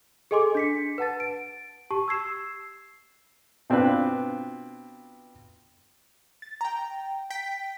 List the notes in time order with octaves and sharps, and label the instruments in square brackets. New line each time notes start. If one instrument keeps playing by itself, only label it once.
[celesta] G#4 A4 D#5 G#5 C6 D6
D4 B6 C#7
B4 F#5 A5 A6
D7
G4 A5 C#6
E6 G#6 C7 E7
[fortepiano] B2 C4 D4 F4 B4
[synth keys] A6
G5 A#5
G5 B6